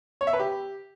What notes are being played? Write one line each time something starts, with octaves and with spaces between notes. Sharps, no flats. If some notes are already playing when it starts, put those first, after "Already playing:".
C#5
E5
B4
G4